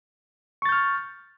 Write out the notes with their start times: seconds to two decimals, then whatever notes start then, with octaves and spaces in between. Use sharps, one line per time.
0.62 C#6
0.65 A6
0.69 G6
0.72 F6